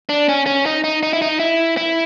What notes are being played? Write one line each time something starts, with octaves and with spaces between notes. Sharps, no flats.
D4
C#4
C#4
D#4
D#4
D#4
E4
D#4
E4
E4